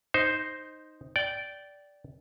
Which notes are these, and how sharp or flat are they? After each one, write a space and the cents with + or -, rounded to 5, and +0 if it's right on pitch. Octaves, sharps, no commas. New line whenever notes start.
D#4 +0 C5 +0
D5 -10 G5 -20